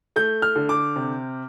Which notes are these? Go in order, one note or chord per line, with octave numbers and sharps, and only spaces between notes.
A3 G6
F6
D3
D6
C3